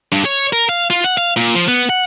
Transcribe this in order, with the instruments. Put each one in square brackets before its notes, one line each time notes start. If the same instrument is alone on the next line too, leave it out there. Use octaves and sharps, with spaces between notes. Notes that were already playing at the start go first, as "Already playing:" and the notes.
[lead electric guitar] G2
C#5
A#4
F5
F4
F#5
F5
A#2
F3
B3
F#5